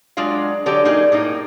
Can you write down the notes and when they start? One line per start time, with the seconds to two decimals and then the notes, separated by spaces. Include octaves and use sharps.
0.17 F#3 G#3 D4 F4 F5
0.66 D3 F#3 G4 A4 D5
0.85 A#3 D#4 G4 G#4
1.12 A2 A#3 D#4